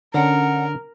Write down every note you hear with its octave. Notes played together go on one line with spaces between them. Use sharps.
D3 C#4 D4 A#4 F#5